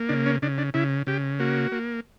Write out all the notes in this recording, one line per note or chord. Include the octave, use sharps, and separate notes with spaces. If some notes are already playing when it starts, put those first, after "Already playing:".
Already playing: A#3
C#3 D4
C#4
C#3 D4
D4
C#3 E4
C#3 G4
A#3 F#4
A#3